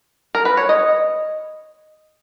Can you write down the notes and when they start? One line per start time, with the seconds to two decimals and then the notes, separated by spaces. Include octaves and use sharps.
0.35 A#4
0.45 B4
0.57 C#5
0.69 D#5